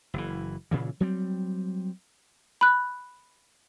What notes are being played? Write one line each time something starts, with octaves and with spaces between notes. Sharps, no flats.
F#1 E3
A#2 C#3 E3
F#3 G3 C4
B5 F#6